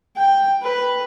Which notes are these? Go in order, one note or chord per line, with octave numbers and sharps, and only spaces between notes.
G5
B4